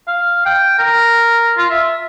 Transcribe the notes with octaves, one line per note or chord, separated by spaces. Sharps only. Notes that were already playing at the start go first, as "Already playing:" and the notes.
F5
G5
A#4
F4
E5